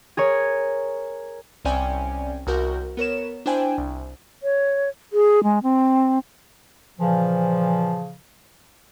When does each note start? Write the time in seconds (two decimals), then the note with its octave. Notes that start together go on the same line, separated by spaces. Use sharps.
0.17 G#4 A#4 C#5
1.65 C2 C4 C#4 D5 G5 G#5
2.47 C2 F#4 A#4 G6
2.97 B3 A#4 C#5 E7
3.46 D4 E4 C5 G5 G#5
3.78 C2
4.43 C#5
5.13 G#4
5.43 G#3
5.63 C4
6.99 A#2 C#3 E3 F3